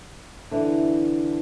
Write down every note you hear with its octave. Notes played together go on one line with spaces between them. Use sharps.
D3 E3